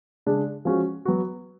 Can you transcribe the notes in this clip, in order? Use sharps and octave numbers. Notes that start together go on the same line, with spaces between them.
C#3 G#3 D4
F3 G#3 C#4 F#4
F#3 B3 F#4